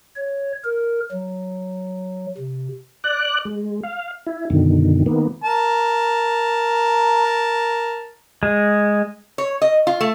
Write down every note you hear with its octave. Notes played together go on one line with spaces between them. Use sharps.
C#5
A#4
F#3
C3
D5 F#6
G#3
F5
E4
F#2 B2 D3 D#3
D#3 A#3 B3
A#4 A5
G#3
C#5
D#5
F4
A3